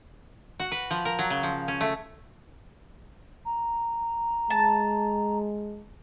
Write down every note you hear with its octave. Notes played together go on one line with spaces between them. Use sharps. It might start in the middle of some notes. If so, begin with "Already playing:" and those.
F#4
B4
F3
A#4
F#3
C#3
F3
C#4
A3
A#5
G#3 A5